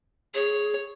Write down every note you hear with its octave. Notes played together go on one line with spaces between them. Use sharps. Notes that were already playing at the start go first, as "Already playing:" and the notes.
G#4 C#5